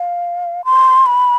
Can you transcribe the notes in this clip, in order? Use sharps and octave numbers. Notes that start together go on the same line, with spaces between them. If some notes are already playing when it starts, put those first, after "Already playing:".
Already playing: F5
C6
B5